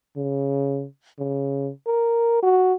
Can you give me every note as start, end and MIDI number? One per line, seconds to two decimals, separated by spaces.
0.16 0.85 49
1.19 1.71 49
1.87 2.42 70
2.42 2.74 66